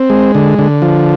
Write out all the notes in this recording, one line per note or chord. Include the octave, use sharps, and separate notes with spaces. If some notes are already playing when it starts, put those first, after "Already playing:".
Already playing: C4
G#3
D3
D3
F3